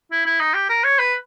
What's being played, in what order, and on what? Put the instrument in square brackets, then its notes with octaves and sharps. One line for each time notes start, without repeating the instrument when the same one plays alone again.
[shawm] E4
E4
D#4
G4
A#4
C#5
B4